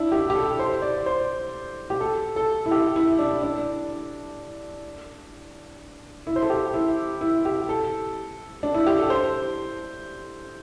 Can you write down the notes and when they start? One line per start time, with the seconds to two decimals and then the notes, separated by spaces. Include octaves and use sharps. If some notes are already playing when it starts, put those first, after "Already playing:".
Already playing: D4 E4
0.12 G4
0.30 G4
0.35 A4
0.59 C5
0.82 D5
1.06 C5
1.90 G4
2.00 A4
2.36 A4
2.66 E4
2.71 G4
2.96 E4
3.19 D4
3.43 D4
6.27 E4
6.36 C5
6.43 A4
6.50 G4
6.74 E4
7.21 E4
7.45 G4
7.69 A4
8.63 D4
8.74 E4
8.87 G4
8.99 A4
9.10 C5